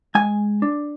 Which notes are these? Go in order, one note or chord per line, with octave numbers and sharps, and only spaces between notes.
G#3 G#5
D4